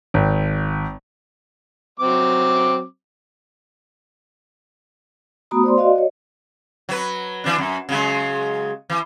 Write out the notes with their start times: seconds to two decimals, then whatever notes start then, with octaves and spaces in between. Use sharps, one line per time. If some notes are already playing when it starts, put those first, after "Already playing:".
0.14 G#1
2.00 F#3 C4 D6
5.51 A3 B3 F#4 A#5 B5 D#6
5.64 C5 D5 C6
5.78 F#4 D5 D#5 F5
5.96 C#5 D#5
6.89 F#3 B4
7.44 E3 D4
7.58 F#2
7.89 C#3 F#3 G#3
8.90 E3